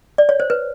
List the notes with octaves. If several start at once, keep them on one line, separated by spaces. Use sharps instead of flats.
D5
C#5
C5
B4